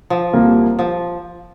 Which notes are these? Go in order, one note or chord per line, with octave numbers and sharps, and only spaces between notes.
F3
C2 A#2 G3 A#3
F3